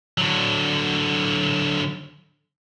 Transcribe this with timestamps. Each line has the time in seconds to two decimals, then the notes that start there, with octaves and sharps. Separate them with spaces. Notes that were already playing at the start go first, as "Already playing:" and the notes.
0.18 D3 F#3